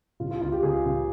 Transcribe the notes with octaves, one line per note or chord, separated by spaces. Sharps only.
C#3 F4
F4
C#2 F4
G4
C#2 G#4
C#3